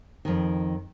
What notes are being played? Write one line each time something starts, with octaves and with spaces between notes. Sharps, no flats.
F2 D#3